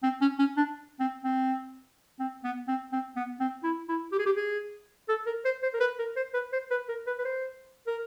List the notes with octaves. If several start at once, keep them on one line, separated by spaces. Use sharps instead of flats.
C4
C#4
C#4
D4
C4
C4
C4
B3
C4
C4
B3
C4
E4
E4
G4
G#4
G4
G#4
A4
A#4
C5
C5
A#4
B4
A#4
C5
B4
C5
B4
A#4
B4
B4
C5
A#4